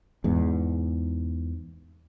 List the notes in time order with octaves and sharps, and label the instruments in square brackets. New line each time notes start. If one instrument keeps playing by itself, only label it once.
[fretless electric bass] E2 G#2